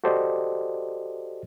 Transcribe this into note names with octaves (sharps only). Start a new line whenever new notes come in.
F#4 G4 A4 C5 D5 D#5